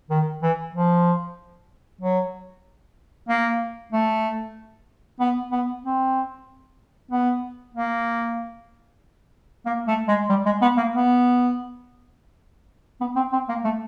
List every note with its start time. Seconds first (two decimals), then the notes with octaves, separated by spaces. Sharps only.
0.10 D#3
0.42 E3
0.74 F3
2.01 F#3
3.29 A#3
3.92 A3
5.20 B3
5.52 B3
5.83 C4
7.11 B3
7.74 A#3
9.66 A#3
9.88 A3
10.08 G#3
10.29 G3
10.46 G#3
10.62 B3
10.77 A#3
10.94 B3
13.01 B3
13.16 C4
13.33 C4
13.49 A#3
13.64 A3